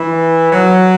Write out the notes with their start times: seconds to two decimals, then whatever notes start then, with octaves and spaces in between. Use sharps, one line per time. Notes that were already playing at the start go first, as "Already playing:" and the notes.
Already playing: E3
0.51 F#3